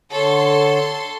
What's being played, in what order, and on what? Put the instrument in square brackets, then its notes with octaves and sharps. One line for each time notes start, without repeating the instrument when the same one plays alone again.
[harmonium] D3 C#5 [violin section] A4 C6